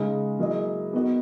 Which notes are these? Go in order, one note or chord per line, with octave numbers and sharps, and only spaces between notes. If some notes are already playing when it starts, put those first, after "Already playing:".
Already playing: C#3 G#3 D#4
F#3 A#3 E4 G#4 D#5
B3 D#4 F#4 A#4